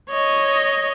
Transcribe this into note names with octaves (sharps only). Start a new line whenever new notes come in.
C#5 D#5